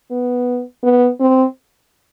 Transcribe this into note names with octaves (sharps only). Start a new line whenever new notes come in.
B3
B3
C4